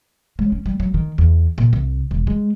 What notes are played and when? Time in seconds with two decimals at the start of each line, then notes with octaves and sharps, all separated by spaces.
0.39 G#3
0.52 C#4
0.66 G3
0.80 F#3
0.94 D#3
1.18 E2
1.58 A#2
1.73 C2
2.11 E1
2.27 G#3